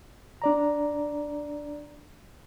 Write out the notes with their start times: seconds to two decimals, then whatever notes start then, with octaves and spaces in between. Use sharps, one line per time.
0.42 D4 D5 A#5